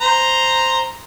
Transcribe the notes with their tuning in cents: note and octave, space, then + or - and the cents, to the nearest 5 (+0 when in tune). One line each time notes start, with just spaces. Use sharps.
C5 +0 A#5 +0